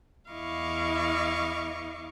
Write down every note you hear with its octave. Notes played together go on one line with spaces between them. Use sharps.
E2 E4 D#5 F5 C#6 D6